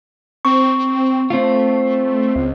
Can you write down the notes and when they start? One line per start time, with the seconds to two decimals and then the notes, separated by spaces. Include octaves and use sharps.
0.45 C4 C#6
1.30 A3 C4 F4
2.36 C#2